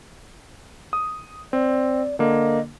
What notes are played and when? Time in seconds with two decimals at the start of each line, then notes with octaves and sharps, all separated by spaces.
0.93 D#6
1.53 C4 D5
2.19 D3 A#3 D#5